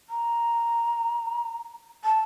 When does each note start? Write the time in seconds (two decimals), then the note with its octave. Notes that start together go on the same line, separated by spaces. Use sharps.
0.10 A#5
2.04 A5